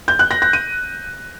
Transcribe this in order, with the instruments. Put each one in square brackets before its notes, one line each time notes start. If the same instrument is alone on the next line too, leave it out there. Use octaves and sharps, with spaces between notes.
[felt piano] G6
F#6
A#6
A#6
D#7